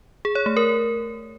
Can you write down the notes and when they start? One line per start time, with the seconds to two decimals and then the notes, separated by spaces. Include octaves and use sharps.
0.25 G#4
0.35 C#5
0.46 A3
0.57 A#4